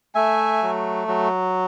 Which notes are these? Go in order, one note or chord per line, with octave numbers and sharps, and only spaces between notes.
A3 E5 G#5
F#3
F#3